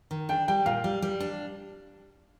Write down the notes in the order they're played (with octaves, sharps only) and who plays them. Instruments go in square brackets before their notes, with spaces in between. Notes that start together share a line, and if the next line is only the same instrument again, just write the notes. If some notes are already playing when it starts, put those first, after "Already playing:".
[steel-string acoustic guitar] D#3
[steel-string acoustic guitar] D4 [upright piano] G5
[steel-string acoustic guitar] G3 [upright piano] G5
[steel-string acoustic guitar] A#2 [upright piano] F5
[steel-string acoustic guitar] G3
G3
D4